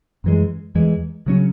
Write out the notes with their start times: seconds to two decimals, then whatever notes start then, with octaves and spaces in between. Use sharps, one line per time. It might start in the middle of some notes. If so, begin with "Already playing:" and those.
0.24 F#2 E3 G#3
0.75 E2 E3 G#3
1.26 C#3 F#3 C#4